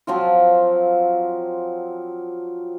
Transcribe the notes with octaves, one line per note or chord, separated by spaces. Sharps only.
F3 F#3 C4 F4